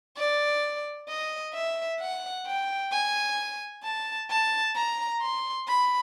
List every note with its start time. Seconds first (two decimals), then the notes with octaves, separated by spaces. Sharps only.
0.17 D5
1.09 D#5
1.54 E5
2.00 F#5
2.46 G5
2.92 G#5
3.83 A5
4.29 A5
4.75 A#5
5.21 C6
5.67 B5